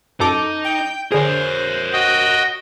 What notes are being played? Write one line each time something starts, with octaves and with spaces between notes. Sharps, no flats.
F#2 D#4 A4 D6
G5
D3 G#4 A#4 C5 C#5
F#4 D#5 G5